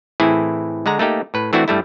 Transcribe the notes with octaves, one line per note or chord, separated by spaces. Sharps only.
A2 E3 C4 E4 G#4
D3 G#3 F#5 A#5
A3 A#3 D#4 G4
A2 B4
E3 A3 C4 D4 E4 F#4
G2 G3 A3 E4